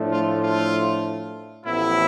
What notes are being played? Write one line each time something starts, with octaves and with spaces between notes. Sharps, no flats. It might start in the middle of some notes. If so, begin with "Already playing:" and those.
Already playing: A2 F3 A3 D4
F4
F4
A1 A2 F3 B3 E4